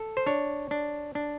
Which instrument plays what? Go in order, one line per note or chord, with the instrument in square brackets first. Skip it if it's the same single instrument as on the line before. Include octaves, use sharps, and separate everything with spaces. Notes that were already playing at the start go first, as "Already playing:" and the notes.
Already playing: [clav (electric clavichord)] A4
C5
D4 C#5
D4
D4